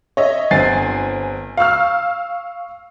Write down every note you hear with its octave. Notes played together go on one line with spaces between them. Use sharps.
C#5 D#5 E5
G1 C4 G#5 A6 C7
F5 C#6 E6 F6